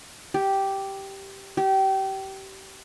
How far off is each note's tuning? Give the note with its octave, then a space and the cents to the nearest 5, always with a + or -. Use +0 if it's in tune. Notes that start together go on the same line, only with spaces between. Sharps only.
G4 -5
G4 -25